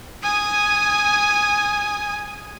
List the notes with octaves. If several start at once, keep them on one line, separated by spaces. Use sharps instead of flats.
G#5 D#6